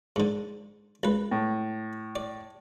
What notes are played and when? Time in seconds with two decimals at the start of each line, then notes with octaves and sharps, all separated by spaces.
0.16 G#2 D3
1.03 C#2 B4
1.31 A2
2.16 D5